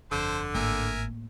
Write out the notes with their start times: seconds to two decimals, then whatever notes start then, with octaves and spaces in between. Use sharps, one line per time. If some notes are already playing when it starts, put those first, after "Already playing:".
0.11 G1 F2 D3 A4 C5
0.55 G#1 A2 A#3 A#4 E5 G#5